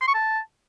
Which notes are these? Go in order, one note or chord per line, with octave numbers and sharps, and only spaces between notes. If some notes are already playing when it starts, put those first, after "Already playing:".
C6
C#6
A5